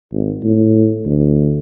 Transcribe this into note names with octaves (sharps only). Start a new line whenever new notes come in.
G#1
A2
D2